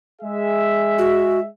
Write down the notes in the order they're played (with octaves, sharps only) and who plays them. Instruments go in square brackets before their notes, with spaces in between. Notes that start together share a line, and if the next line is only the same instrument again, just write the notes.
[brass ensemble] G#3 G#4 E5
[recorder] F#4